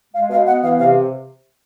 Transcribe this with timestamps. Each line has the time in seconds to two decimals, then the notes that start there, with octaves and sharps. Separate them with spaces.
0.14 G#3 F5
0.30 B2 F5
0.46 B3 F#5
0.62 E3 F5
0.78 C3 F5